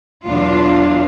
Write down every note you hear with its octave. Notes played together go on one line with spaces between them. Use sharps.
E2 B2 F#3 D4 F4